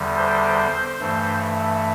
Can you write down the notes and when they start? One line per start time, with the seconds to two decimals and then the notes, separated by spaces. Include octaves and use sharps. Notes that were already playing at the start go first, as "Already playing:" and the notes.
Already playing: E2 D3 G3
0.17 C5
1.00 G2 E3 A3